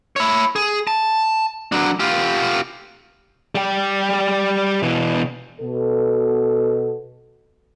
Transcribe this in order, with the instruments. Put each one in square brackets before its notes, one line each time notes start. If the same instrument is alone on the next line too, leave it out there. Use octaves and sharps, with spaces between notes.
[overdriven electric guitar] E4 C#5
G#4
A5
F#3 D4
F4 G4
[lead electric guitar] G3 G5
B2 E3
[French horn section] B2 A4